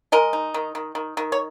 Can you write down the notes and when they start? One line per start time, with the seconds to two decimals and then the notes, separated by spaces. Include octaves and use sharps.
0.12 G#3 A#4 D#5
0.33 D#4
0.54 D#3
0.75 D#3
0.95 D#3
1.17 D#3
1.32 C#5